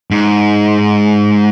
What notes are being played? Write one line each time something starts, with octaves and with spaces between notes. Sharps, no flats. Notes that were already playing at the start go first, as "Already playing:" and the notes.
G#2